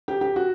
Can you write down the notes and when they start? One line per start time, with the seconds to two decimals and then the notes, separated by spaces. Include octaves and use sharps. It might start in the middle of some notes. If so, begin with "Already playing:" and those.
0.08 G4
0.21 G4
0.36 F#4